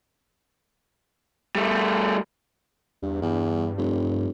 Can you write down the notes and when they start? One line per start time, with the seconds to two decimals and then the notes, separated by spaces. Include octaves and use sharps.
1.55 G3 A3
3.03 E2 G2
3.22 E2 G2
3.78 F1